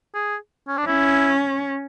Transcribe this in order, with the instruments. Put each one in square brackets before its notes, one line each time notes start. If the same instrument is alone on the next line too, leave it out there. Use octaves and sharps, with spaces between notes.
[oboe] G#4
C#4
D4
[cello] C#4 [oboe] E4